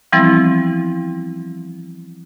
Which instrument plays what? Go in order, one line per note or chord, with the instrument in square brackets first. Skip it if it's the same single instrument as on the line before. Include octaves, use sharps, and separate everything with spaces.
[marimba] E3 F3 G3 B3 C4 E4